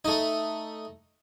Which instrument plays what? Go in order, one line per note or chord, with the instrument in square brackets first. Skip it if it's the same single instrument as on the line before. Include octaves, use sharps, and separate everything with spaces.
[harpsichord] A3 D#4